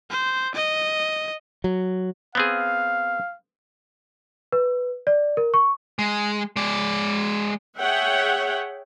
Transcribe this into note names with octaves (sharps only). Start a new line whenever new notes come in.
C5
D#5
F#3
B3 C4 G#4 F5
B4
D5
A#4
C#6
G#3
G#3 D5
G#4 C#5 E5 F#5 G5